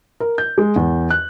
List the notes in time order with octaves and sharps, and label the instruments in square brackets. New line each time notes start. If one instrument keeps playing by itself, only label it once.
[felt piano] A#4
G6
G#3
E2
F#6